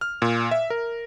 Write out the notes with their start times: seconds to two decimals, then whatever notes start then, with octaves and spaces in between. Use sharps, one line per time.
0.01 F6
0.22 A#2
0.51 E5
0.70 A#4